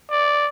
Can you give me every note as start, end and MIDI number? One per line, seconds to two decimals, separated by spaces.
0.11 0.49 74